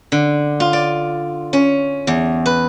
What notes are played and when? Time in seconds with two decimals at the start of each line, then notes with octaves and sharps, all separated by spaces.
0.12 D3
0.60 F4
0.73 D5
1.53 C#4
2.07 E2
2.46 B4